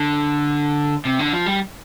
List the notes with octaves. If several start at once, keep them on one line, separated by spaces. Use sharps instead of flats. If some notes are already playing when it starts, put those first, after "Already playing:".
Already playing: D3
C3
D3
F3
G3